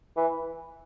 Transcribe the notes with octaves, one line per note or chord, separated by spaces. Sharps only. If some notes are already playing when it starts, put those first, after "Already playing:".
E3